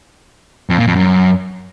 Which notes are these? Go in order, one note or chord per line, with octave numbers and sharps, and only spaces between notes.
F2
A#2
F2
F#2